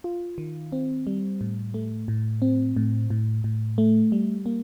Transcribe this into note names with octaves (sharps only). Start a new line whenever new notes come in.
F4
D#3
C4
G3
A2
A3
A2
C4
A2
A2
A2
A3
G3
A#3